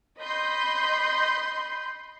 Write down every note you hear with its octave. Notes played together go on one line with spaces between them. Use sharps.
D#5 B5 C6 G6